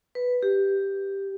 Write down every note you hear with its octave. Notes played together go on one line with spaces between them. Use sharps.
B4
G4